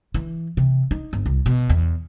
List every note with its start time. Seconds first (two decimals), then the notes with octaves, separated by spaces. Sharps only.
0.14 E3
0.57 C3
0.91 D#4
1.13 G1
1.26 C2
1.46 B2
1.70 E2